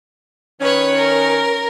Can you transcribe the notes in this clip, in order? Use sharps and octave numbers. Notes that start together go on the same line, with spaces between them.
D#3 C#4 B4 C#5
A#4